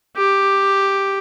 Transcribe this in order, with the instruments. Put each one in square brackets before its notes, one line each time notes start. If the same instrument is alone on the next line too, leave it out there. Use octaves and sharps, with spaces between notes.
[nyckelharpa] G4